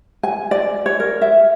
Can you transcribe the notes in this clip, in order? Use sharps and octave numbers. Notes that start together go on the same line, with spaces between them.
G#5
D5
C#5
A#4
E5